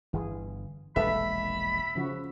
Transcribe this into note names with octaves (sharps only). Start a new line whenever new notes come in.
G1 E3 G#4
E1 A#1 G3 G#3 A4 B4 E5 B5
C#3 F3 F#4